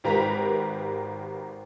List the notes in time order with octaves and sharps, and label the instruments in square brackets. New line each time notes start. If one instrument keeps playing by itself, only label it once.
[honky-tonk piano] G#1 G4 A#4 B4 A#5 B6